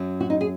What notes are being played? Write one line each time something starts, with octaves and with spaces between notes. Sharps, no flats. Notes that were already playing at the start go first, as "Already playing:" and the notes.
Already playing: F#2 F#3
F#4
D#4
G#4